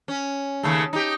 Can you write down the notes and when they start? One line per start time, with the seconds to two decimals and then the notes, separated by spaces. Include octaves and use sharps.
0.08 C#4
0.63 D#2 C#3 A3
0.93 D#4 G4